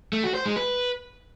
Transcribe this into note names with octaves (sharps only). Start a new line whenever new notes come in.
A3
F#4
C5
G#3
B4